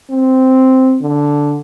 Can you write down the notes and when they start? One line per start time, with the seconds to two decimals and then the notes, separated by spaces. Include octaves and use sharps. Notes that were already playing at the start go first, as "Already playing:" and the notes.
0.11 C4
1.01 D3